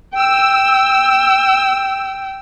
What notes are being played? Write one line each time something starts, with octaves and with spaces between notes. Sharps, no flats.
G5 E6